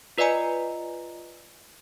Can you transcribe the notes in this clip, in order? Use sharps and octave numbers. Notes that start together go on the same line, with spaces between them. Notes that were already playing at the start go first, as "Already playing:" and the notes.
F4 B4 D5 D#5 G#5 A#5